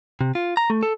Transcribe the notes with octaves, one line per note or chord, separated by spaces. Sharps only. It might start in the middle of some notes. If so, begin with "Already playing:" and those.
C3
F4
A#5
A3
A4